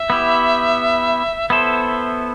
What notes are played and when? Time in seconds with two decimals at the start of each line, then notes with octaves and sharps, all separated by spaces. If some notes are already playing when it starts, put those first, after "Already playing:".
Already playing: E5
0.10 B3 E4 G4
1.50 B3 E4 A4 C5 E5